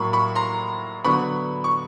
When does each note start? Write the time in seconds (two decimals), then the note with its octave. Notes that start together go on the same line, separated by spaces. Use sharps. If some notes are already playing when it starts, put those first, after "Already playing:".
Already playing: A2 F#3 A#3 B5 C#6
0.13 B5 C#6
0.35 A#5 C6
1.05 D3 F#3 B3 B5 C#6
1.64 C#6